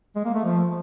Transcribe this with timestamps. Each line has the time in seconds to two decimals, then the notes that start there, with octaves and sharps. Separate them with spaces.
0.15 G#3
0.25 A#3
0.35 A3
0.44 F3